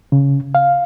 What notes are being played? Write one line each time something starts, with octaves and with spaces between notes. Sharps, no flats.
C#3
F5